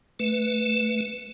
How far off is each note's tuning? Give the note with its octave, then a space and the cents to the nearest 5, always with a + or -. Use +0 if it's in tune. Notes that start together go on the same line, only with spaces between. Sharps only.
A3 +0 B4 +0